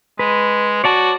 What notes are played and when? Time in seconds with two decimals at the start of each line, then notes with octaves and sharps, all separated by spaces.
0.19 G#3 B4
0.84 F#4 C#5 D5 A5